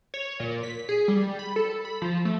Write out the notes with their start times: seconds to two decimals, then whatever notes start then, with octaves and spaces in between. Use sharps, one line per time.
0.14 C#5
0.40 A#2
0.63 B6
0.89 G#4
1.08 G3
1.39 B5
1.56 A4
1.85 B5
2.02 F3
2.25 A3